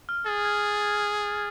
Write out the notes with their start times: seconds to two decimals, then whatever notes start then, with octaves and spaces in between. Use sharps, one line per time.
0.09 F6
0.26 G#4 A6
0.45 G#6